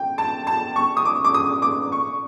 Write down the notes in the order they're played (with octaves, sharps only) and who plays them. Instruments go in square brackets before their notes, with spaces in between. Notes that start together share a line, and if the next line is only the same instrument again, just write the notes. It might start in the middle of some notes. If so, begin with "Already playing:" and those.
Already playing: [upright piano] G5
A5
A5
C#6
D#6
D6
D6
D#6
D6
C#6